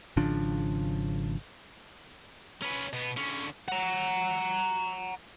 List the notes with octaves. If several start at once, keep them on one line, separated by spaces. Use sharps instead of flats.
G#1 C#3 F3 D4
C#4 B4
B2 B3
D3 C#4
F#5 A#5